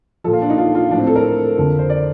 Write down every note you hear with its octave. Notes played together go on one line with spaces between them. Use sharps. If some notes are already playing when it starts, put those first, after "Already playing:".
A#2 F3 A4
F4
D4
D#4
F4
F4
A2 F3 D4
C4
A4
A#4
F2 D3 F3
C5
D5